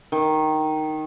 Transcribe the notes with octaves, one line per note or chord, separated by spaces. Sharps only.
D#3